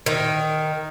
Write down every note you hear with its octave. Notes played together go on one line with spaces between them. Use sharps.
D#3